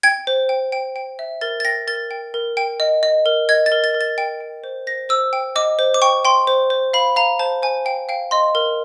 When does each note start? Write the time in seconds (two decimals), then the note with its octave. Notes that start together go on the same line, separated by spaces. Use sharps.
0.03 G5 G#6
0.27 C5
0.49 G5
0.72 G5
0.96 G5
1.19 E5
1.41 A#4 A6
1.60 A6
1.65 G5 A#6
1.87 A#4 A6
2.11 G5
2.34 A#4
2.57 G5
2.80 D#5
3.03 D#5
3.26 A#4
3.49 D#5 G#6
3.66 A6
3.72 A#4
3.84 A6
3.94 A#4
4.01 A6
4.18 G5
4.40 G5
4.64 C5
4.87 C5 A#6
5.09 C5 E6
5.33 G5
5.56 D#5 D6
5.79 C5
5.94 D6
6.02 G5 C#6
6.25 G5 C6
6.47 C5
6.70 C5
6.93 F5 B5
7.16 F5 A#5
7.39 C5 A5
7.62 C5 G#5
7.85 F5 G5
8.09 F5 G5
8.31 D#5 C6
8.55 A#4